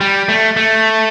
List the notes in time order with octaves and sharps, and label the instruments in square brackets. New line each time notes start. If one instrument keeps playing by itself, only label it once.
[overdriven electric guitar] G3
A3
A3